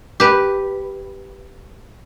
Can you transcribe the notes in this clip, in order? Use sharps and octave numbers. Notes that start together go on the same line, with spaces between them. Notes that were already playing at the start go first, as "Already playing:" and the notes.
G4 B4